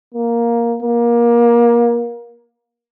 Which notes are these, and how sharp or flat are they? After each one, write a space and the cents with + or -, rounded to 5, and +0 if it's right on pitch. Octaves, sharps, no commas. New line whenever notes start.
A#3 +5
A#3 +25